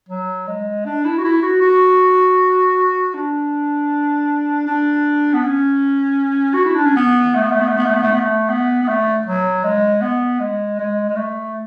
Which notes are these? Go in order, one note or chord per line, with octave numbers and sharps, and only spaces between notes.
F#3
G#3
D4
E4
F#4
E4
F#4
F#4
D4
D4
B3
C#4
F#4
E4
D4
C#4
B3
A3
B3
A3
B3
A3
B3
A3
B3
A3
B3
A3
B3
B3
A3
F#3
G#3
B3
G#3
G#3
G#3
A3